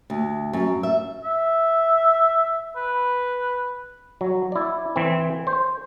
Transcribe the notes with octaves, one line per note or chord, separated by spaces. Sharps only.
D2
F#2
E5
E5
B4
F#3
E4 D5
E3 C4
C5